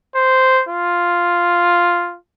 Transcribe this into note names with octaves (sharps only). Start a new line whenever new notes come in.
C5
F4